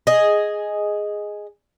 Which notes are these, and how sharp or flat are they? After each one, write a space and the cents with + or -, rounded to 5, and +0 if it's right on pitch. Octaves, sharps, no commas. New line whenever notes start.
G#4 +0 D#5 +0